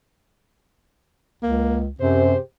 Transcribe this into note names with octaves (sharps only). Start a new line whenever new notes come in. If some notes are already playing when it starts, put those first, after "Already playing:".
C#2 A#3
F#2 C3 G4 G#4 C5